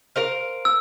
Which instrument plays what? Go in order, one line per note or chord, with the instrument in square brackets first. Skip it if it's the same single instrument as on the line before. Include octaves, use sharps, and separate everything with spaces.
[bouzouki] A#4 C5 F5
[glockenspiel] E6